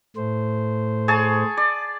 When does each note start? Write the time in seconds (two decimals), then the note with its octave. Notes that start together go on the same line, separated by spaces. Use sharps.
0.16 A2 A3 C5
1.08 G#4 C#5 A5
1.57 D5